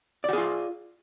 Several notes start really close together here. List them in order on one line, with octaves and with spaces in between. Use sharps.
D5 F#4 G#4 F4